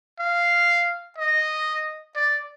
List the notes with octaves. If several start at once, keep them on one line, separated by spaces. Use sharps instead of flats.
F5
D#5
D5